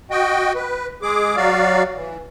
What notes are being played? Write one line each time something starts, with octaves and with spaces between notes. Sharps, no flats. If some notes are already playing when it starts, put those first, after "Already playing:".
F#4 D#5 G5
B4
G#3 G#4 D6
F#3 F#4 D5 F5
E3